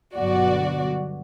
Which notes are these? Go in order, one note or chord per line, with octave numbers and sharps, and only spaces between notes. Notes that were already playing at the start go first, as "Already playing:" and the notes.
G1 B2 F#3 F#4 D5